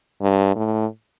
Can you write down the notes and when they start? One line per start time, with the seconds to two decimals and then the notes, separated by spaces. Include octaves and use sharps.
0.21 G2
0.56 A2